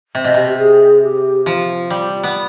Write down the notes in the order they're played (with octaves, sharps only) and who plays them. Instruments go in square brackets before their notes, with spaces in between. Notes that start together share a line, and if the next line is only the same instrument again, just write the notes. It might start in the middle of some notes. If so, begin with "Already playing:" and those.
[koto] C3
B2
[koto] C3 [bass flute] G4
[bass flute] G4
G#4
G4
[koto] F3 [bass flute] F4
[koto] G3
B3